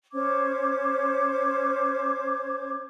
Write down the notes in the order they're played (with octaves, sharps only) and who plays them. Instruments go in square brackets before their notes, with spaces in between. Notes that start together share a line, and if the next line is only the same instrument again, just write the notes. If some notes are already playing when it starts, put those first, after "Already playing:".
[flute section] C#4 C5 D6 G#6